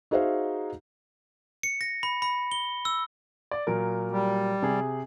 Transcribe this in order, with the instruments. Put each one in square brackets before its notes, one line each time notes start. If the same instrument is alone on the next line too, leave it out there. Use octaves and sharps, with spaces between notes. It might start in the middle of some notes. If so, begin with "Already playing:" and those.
[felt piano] D#4 F#4 G#4 C5 E5 F5
[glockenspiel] C#7
A#6
B5
B5
G7
E6
[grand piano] D5
A#2 F#3 A#4
[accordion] G3
[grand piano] C3 G#4